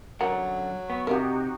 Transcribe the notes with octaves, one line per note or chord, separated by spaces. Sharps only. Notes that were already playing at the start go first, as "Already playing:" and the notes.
F#2 D3 F#3 A#4 F#5
B3 C#6
C3 D#4 F#4 G4 A#4 F#5